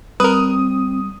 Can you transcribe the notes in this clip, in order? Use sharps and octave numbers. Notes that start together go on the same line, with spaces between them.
G3 C4 A#4 B4 D#6